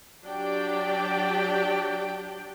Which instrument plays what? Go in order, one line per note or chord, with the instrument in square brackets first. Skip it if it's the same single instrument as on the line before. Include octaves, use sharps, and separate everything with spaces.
[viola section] F#3 D4 G4 D5 G5